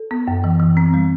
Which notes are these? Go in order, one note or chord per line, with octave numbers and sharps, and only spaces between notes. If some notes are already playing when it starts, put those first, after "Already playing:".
Already playing: A4
B3
F#2
E3
E3
C4
G3